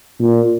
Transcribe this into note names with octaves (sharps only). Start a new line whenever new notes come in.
A#2